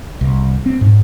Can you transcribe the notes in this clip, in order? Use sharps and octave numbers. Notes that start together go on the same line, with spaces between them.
C2
C4
G#2